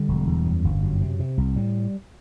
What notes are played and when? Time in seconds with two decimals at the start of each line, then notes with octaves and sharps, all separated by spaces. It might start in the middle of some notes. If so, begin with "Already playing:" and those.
Already playing: D3 G3
0.08 E1
0.27 E2
0.45 F#2
0.64 G1
0.83 F#2
1.01 C3
1.20 C3
1.38 C2
1.56 A2 G3